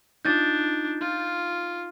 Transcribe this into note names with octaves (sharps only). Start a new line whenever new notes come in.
D4 D#4 F4 G6 A6
F4 G#6